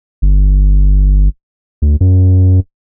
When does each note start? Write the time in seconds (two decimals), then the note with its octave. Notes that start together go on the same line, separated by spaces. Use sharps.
0.22 G1
1.82 D2
2.01 F#2